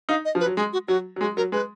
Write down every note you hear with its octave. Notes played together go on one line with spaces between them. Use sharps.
D#4 F5
D#5
F3
B4
F#3
G#3 G#4
F#4
F#3 F#4
F#3
G#3 F#4
F#3 A#4
G#3 B4